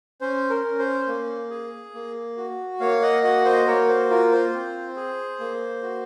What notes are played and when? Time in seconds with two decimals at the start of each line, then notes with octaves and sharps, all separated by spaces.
0.21 C#4 C5
0.50 A#4
0.64 C#4
0.79 C5
1.07 A#3
1.50 G#4
1.94 A#3
2.37 F#4
2.80 A#3 C#5 F5
3.02 D#5 F#5
3.23 F#4 D#5 F#5
3.45 C5 D#5
3.67 A#3 A#4 C#5
3.88 C5
4.10 F4 A#4
4.32 C5
4.54 C4
4.96 G#4
5.40 A#3
5.83 F#4